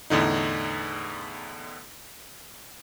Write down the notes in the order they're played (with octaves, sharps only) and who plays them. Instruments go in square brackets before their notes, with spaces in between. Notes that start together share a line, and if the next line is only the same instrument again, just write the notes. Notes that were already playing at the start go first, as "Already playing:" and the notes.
[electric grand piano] E2 A2 D3 D#4